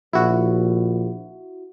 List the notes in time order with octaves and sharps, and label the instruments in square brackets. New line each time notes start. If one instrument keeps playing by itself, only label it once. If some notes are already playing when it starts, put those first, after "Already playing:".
[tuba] A#1 [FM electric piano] E4 F#4